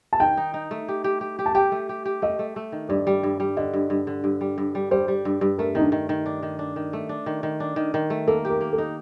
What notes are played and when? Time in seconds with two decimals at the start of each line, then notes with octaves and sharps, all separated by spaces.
0.13 A5
0.20 D#3 G5
0.37 D#4
0.54 D#4
0.71 A3
0.88 G4
1.04 G4
1.21 G4
1.39 G4
1.46 A5
1.55 G4 G5
1.72 A3
1.89 G4
2.05 G4
2.22 A3 D#5
2.39 A3
2.56 A3
2.72 D#3
2.89 G2 D5
3.07 G3
3.23 G2
3.40 G3
3.57 D3 D#5
3.74 G2
3.90 G2
4.07 D3
4.24 G2
4.41 G3
4.58 G2
4.75 G3
4.91 G3 C5
5.08 G3
5.25 G2
5.41 G2
5.58 A3 A#4
5.75 D#3 D#4
5.81 D4
5.92 D#3
6.09 D#3
6.26 D4
6.43 D#3
6.59 D4
6.76 D#3
6.93 A3
7.09 D4
7.26 D#3
7.43 D#3
7.60 D4
7.76 D#3
7.94 D#3
8.10 A3
8.27 A#3 A4
8.45 G4
8.50 A#4
8.61 A#3
8.73 A4
8.78 D#4